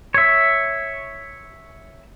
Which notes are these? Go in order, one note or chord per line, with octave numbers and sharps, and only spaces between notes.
C#5 E5